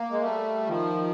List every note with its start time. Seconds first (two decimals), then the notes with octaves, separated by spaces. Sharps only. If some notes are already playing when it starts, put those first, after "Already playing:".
Already playing: A#3
0.11 G#3
0.21 G3 A3
0.67 D#3 F3